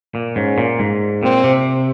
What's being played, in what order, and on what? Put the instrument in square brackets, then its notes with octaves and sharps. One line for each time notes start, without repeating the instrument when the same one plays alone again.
[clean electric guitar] A#2
[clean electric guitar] G#2 [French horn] C#4
[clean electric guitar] A#2
G#2
[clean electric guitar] A#2 [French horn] C4
[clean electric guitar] C3